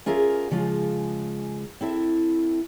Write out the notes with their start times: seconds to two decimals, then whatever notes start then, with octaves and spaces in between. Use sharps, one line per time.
0.06 C#4 F4 G#4 A#4 E5 F5
0.51 C#3 F3 G#3 F4
1.81 C4 E4 A4 E5